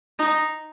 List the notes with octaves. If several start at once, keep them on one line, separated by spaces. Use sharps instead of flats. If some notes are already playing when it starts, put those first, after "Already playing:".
D#4